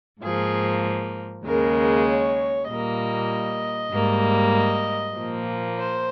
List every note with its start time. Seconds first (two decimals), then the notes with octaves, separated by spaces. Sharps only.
0.22 G#2 F3 A#3 G#4
1.46 D#2 C#3 G#3 A#4
2.07 C#5
2.69 A#2 G3 A#3 D#5
3.93 G#2 G3 A#3
4.55 D#5
5.16 A#2 F3 A#3
5.78 C5